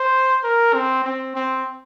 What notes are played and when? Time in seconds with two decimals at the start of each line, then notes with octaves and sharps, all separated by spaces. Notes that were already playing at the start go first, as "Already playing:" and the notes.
Already playing: C5
0.43 A#4
0.74 C4
1.04 C4
1.36 C4